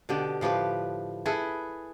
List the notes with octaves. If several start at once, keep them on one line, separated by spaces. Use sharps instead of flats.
B2 D3 G4
A2 F3 G4 B4
E4 G#4 A4 B4